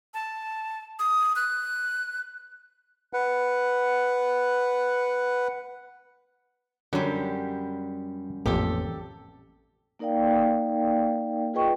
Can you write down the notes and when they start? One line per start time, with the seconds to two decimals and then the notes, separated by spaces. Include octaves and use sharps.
0.14 A5
0.99 D#6
1.36 F#6
3.13 B4 F#5
6.93 F#2 D3 F#3 G3
8.46 A1 F2 A#2 G4 A4
9.99 A#3 D#4 A#4 D5 F5 G5
11.54 F4 G#4 B4 D#5 G5 C#6